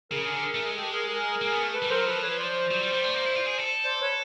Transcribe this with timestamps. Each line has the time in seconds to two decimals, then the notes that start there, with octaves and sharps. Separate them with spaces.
0.11 C#3 G#4 A#4
0.28 D3
0.55 A3
0.66 G#3
0.76 G4 A4
0.93 G#4 A#4
1.09 G#4 A#4
1.41 A#3
1.52 B3
1.63 A3
1.74 A4 B4
1.82 G3
1.90 F#3 A#4 C5
2.06 F3 A4 B4
2.22 B4 C#5
2.39 C5 D5
2.71 F#3
2.82 G3
2.93 G3
3.04 A3
3.14 A#3
3.26 E4
3.36 F4
3.47 G#4
3.58 A4
3.84 C5 D5
4.01 B4 C#5